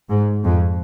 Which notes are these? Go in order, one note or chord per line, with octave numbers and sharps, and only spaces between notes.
G#2
F2